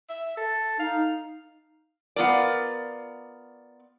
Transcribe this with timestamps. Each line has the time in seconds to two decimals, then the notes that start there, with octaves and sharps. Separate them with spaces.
0.09 E5
0.37 A4
0.79 D#4 F5
2.16 B3 F4 A#4 D5